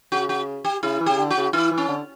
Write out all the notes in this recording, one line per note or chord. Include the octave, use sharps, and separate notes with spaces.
C#3 F#4
F#4
G4
C#3 E4
E3
C#3 G4
D3
F#4
C#3
E3 E4
E3
C#4
D3